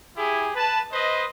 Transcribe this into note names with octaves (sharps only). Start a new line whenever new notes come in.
E4 G4 G#4
B4 A5
B4 C5 D#5